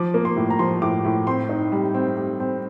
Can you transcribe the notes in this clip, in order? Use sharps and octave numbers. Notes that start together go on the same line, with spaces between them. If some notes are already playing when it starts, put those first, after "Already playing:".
Already playing: F3 D6
A#3
C6
A2
A#5
F3 C6
A2 D6
A2
C4 C6
D#4
G3
C4
G3
C4